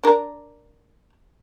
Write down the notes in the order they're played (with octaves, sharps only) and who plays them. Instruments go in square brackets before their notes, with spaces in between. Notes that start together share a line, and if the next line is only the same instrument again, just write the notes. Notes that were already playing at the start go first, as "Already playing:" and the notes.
[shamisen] D4 A#4